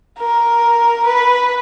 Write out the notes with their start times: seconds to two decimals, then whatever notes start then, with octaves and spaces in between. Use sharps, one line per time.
0.18 A#4
1.06 B4